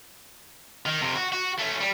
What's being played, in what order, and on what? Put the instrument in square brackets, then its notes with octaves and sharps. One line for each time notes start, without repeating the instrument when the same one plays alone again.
[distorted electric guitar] D#3
F2 C3
F#4
F#4
A3 C#4
G3